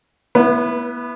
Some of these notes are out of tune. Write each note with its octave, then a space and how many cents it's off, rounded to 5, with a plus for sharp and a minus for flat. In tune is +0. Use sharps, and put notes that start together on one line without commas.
B3 -30 E4 +0 B4 +0